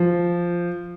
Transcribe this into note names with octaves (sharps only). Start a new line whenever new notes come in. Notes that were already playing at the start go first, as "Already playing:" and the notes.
Already playing: F3